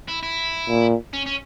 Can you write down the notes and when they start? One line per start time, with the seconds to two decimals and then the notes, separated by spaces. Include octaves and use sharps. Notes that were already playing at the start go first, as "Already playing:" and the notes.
0.08 E4
0.23 E4
0.68 A#2
1.13 C#4
1.26 C#4